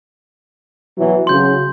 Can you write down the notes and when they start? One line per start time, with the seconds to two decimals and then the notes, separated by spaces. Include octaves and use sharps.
0.97 B2 E3 F#3
1.27 C#3 F#3 C6 G6